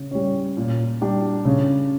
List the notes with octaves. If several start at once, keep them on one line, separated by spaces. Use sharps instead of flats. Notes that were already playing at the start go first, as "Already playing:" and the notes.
Already playing: C#3
G3 C#4
A#2
G3 D4 G4
C#3